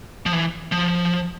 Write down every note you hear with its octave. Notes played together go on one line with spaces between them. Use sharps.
F3
E3
F3